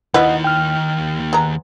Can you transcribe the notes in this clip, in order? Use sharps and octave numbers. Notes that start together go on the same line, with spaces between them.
D#2 D#3 E4 F4 B4 D#5 F#5
G5 F6
G#3 B3 A#5